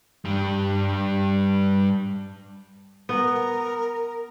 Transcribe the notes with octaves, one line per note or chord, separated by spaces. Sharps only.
G2 G3
B3 A#4